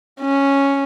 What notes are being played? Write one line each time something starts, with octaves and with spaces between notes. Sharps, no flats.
C#4